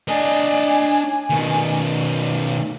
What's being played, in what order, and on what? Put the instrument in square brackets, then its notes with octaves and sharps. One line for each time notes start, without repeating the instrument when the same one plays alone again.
[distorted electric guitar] D4 D#5 [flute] G#5
[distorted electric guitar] B2 D#3